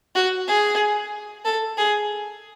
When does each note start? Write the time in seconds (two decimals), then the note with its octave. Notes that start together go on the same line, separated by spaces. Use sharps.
0.15 F#4
0.47 G#4
1.45 A4
1.78 G#4